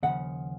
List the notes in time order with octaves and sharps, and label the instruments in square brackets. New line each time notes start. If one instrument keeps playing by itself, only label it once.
[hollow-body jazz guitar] D#2 C#3 F3 [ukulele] F#5